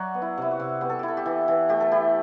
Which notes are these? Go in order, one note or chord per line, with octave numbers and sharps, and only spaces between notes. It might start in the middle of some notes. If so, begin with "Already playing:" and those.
Already playing: F#3 F#4 D5 E5
B3
E4
C3 E4
F#4
C3
B3 G4
A4
E4 G4
A4
G4
E3
E3
A3 G4
A4
E4 G4